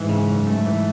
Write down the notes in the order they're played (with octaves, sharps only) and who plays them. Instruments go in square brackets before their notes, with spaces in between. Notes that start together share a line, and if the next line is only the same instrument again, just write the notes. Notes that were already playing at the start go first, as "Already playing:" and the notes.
Already playing: [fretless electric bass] G#2 [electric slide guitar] E3
[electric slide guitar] C#3
F#2
A3
E3